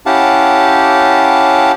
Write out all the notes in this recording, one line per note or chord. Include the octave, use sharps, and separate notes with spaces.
C#4 E4 G4 F5 F#5 A5